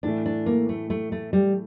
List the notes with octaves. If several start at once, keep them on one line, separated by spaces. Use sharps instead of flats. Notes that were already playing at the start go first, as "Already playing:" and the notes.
A2 E3 A3 D4
D4
A#3
A3
A3
A3
G3